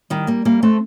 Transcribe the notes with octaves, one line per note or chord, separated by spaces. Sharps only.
D#3 G3
G3 A#3
G3 A#3
A3 C4